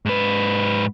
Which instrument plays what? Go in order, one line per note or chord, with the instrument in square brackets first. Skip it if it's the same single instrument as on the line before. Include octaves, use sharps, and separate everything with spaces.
[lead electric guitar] G#2 B4